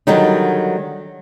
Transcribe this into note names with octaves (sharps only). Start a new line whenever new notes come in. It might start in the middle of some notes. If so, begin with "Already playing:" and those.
D3 D#3 F#3 G3 D#4